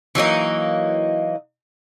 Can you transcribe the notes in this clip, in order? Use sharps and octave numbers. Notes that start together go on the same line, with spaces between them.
E3 F#3 A#3 D#4